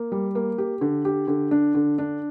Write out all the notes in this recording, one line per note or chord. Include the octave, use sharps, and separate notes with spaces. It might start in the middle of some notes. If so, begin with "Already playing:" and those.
Already playing: A#3
G3
A#3
G4
D3
G4
D3
D4
D3
D4